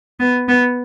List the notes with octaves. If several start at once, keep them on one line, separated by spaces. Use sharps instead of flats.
B3
B3